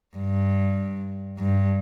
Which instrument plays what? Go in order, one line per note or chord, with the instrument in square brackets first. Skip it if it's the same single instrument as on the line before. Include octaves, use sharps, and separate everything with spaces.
[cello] G2
G2